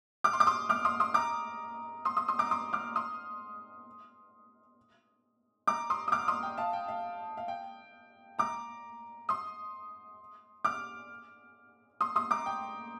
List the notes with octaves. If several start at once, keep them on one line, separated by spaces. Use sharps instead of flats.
D6 F6
C6
D6
C6 D#6
D6 F6
C6 D#6
C6 D#6
A#5 D6
C6 D#6
C6 D#6
C6 D#6
A#5 D6
C6 D#6
D6 F6
C6 D#6
A#5 D6
C6 D#6
D#6
D6 F6
C6 D#6
G5
F5 A5
G5
F5
F5
G5
A#5 D6
C6 D#6
D6 F6
C6 D#6
C6 D#6
A#5 D6
G5